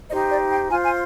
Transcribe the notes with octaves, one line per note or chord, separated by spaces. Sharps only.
D#4 G4 C5 D#5
D5
G5
F4 C5 G#5
G#5